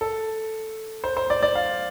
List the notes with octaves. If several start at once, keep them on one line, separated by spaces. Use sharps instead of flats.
A4
C5
C5
D5
D5
F5